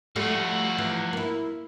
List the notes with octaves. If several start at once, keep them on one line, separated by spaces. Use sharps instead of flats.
F3 G3 A3 F#4
E3
A#3 E4